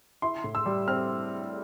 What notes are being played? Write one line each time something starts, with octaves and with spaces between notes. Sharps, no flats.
E4 C6
A2
E6
G3
C4 F6